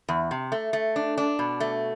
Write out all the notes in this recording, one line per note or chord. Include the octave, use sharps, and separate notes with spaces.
E2
C3
A3
A3
D4
D4
B2
A3